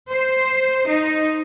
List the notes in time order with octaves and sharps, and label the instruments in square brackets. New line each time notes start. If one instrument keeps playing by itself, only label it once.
[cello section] C5
D#4